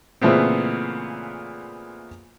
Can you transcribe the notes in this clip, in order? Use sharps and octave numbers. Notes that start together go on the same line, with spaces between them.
A#2 C#3 E3 A3 B3 C4